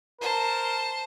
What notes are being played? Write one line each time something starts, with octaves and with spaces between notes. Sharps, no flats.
A#4 C5 A5